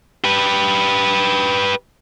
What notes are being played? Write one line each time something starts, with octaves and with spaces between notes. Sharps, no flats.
G4 B4